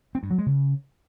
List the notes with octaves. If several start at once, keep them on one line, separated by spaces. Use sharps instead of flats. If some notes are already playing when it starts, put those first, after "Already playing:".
C4
G2
F#3
G#3
C#3